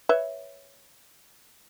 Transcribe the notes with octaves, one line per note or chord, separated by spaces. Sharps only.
B4 C#5 E5